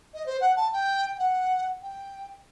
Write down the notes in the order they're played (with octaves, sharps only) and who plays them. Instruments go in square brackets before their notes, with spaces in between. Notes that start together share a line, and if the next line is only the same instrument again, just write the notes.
[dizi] D#5
C5
F#5
A5
G5
G5
F#5
G5